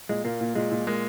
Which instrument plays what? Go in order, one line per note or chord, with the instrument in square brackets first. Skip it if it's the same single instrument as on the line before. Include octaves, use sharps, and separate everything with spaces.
[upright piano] A#2 [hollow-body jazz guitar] G#3
[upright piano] A#2 [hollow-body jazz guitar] A#3
[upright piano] A#2
[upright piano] A#2 [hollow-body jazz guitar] G#3
[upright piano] A#2
[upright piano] G#3 [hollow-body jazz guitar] A#3